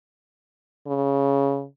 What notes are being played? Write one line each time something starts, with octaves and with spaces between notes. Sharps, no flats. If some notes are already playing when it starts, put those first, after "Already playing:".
C#3